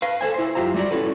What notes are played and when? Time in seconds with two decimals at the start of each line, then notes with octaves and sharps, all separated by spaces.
0.02 B4 F5
0.21 A4 C5 G#5
0.34 E4 C5
0.55 F#2 F4 G4 E5 A#5
0.74 G3 A3 F#4 G4 D5
0.91 C#4 E4 F#4 A4 B4